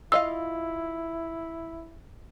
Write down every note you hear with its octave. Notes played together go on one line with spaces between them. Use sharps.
E4 F4 D#5 F5 E6